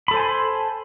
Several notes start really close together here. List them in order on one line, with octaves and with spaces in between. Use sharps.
B5 A4 C5 G#5 C6